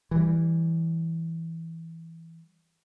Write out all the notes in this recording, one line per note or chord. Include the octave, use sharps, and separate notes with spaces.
E3 G3